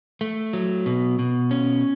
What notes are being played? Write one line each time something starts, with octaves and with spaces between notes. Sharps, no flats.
A3
F#3
B2
B2
C#4